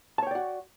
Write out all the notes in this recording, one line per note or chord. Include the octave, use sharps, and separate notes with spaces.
F#4 C#5 D5 G5 A5